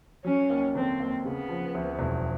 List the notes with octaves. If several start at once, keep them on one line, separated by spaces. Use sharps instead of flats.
F#3 C#4
D#2
D3 C4
D#2
C#3 B3
F3
D2
E1